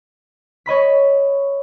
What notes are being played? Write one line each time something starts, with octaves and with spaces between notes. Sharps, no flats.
C#5 D#5 B5 B6